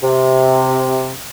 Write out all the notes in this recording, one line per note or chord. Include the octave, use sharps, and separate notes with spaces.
C3